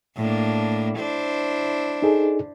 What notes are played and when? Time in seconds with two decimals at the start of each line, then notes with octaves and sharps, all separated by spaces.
0.17 A2 A#3 D4
0.96 D4 E4 C5
2.02 D#4 G#4 A4